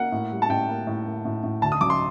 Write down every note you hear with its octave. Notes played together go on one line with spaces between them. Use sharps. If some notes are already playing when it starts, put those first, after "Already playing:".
Already playing: A#3 F#5
A2
G3
A5
A2 G5
A#3
A2
A#3
A2
A2
D2 A5
D#6
F#3 D6
C6